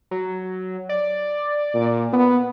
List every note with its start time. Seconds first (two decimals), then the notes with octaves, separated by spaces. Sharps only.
0.11 F#3
0.89 D5
1.74 A#2
2.13 B3